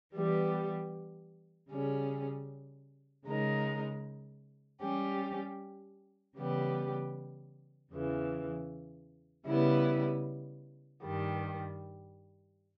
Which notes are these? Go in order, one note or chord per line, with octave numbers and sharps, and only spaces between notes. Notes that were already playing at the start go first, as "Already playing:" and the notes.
E3 G3 B3 G4
C#3 G3 C#4 G#4
C#3 G#3 D#4 A#4
G3 C#4 G4
C#3 E3 G3 B3 G4
E2 C#3 E3
C#3 G3 B3 E4
G2 D#3 G3